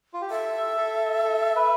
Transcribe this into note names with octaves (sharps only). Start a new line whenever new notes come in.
F4
G4
A4 E5
A4
A4
B4